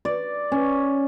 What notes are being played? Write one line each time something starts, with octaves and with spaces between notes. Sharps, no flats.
D5
C#4